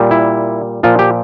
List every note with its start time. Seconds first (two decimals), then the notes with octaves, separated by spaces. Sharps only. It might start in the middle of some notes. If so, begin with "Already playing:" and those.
Already playing: A#2 G3
0.11 E4
0.83 A#2 F3 F4
0.99 G4